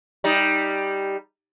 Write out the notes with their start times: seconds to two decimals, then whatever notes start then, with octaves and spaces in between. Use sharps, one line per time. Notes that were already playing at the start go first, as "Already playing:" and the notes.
0.24 G3 D#4